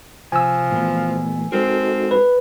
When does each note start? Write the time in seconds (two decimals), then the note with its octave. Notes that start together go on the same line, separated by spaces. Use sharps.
0.32 C3 F3 G#5 E6
0.72 A#2 E3 A3 B3
1.52 G#3 C4 D#4 F4 F#4 A4 A#4
2.11 B4